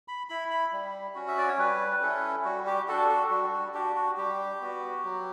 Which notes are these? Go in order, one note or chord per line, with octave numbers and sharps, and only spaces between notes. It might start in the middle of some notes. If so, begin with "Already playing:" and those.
B5
E4 B5
B5
G3
C#4 F#4
E5
D5
C#5
G3 B4
B4
C#4 E4 A4
G3 F#4
G4
D4 F#4 A4
A4
G3 F#4
F#4
D4 F#4 G4
F#4
G3 G4
B3 F#4
F#3